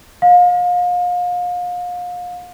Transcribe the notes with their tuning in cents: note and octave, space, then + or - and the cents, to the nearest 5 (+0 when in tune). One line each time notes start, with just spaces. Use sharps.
F5 +35